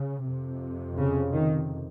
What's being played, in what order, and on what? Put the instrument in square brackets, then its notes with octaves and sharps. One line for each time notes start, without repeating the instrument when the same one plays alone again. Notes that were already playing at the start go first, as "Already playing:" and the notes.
Already playing: [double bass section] C#3
F2 C3
C#3
D#3